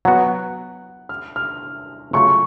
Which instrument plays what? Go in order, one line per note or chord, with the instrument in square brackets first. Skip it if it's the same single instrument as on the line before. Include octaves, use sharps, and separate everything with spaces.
[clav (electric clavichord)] F#3 B3 F#4 [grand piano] F#5
[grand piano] F6
F6
[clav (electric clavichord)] C#3 F#3 A3 F4 [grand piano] C#6